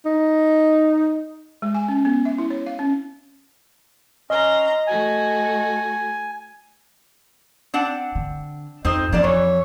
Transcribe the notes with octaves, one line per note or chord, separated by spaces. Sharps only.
D#4
G#3
G#5
C#4
B3
E5
E4
C#5
F5
C#4
C#4 D#5 A#5 C6
A3 F#4 A4 G#5
C4 D4 F#5
D3
F2 C4 D#4 C5
F2 F3 A#3 D4 D5
E3 C#5